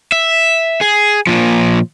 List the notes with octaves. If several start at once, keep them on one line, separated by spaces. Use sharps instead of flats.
E5
G#4
A#2 F3